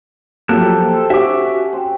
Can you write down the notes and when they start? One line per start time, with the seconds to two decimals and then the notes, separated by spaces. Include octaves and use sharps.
0.49 C3 F3 F#3 A#3 G4 A4 F#6
0.89 C5 A5
1.10 C#4 F#4 G4 E5 F#5 D6
1.73 C4